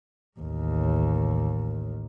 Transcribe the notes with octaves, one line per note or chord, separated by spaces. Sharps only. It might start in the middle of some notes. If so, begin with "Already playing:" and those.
A1 D#2